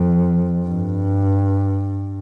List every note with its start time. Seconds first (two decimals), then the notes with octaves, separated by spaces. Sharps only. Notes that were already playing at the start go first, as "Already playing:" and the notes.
Already playing: F2
0.68 G2